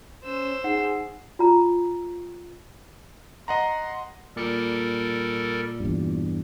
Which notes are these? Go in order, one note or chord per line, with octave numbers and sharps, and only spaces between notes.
C#4 C5 E6
D#4 G#4 F#5 C7
F4 A#5
D#5 F#5 A#5 C6
A#2 G3 A4 A#4 D5 C#7
E2 G2